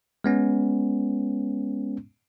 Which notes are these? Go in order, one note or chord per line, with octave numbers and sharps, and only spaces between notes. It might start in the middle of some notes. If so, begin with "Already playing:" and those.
G#3 B3 C#4